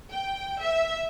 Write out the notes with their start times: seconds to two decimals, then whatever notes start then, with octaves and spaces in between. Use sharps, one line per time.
0.10 G5
0.61 E5